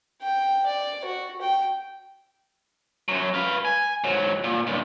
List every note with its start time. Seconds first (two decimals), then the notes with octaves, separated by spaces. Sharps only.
0.22 G5
0.66 D5
1.05 F#4
1.41 G5
3.08 F#2 F#3
3.34 B4 F5
3.65 G#5
4.04 G#2 F#3
4.44 A#2
4.67 B1 G2